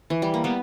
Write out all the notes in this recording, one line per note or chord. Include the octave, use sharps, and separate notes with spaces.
E3
G3
A#3
G3 B3